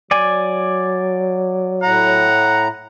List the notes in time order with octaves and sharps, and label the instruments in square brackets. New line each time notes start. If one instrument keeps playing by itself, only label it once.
[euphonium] F#3 [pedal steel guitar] D5 G#5
[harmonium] A2 A#5 [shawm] F#5